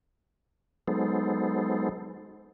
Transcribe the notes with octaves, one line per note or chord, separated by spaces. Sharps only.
F#3 G#3 B3 D#4 A4 C5